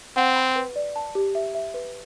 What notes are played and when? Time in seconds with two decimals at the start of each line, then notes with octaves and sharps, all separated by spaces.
0.17 C4 F#5
0.36 B5
0.56 B4
0.76 D5
0.96 A5
1.15 G4
1.35 E5
1.55 E5
1.74 B4